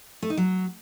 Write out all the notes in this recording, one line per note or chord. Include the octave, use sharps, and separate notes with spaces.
A3
D#4
F#3